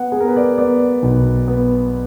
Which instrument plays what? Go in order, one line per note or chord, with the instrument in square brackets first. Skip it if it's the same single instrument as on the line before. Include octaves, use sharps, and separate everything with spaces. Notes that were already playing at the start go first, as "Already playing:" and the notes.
Already playing: [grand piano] B3 F#5
B3 G#4
A#4
B4
D5
B3 D5
B1
B3